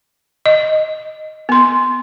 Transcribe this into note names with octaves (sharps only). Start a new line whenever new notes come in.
D#5
B3 C6